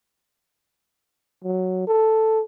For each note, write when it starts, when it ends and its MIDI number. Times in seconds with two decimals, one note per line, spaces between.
1.44 1.86 54
1.87 2.41 69